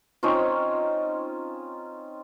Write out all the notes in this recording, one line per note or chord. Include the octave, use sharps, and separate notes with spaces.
C4 C#4 D#4 F4